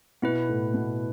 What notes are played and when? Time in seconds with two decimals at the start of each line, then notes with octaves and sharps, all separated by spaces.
0.22 B2 B3 E4 B4
0.49 A2
0.74 B2